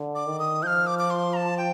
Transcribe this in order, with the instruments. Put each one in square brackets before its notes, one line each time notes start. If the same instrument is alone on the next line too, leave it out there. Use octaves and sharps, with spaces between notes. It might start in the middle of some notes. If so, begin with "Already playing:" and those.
Already playing: [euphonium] D3
[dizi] D6
[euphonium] D#3
[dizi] D#6
[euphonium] F3 [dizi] F6 G6
[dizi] D6
D6
C6
A#5
A5
G5